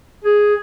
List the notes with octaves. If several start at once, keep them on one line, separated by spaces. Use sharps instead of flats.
G#4